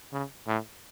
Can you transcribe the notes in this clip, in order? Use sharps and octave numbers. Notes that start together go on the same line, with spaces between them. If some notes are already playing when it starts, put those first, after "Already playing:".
C#3
A2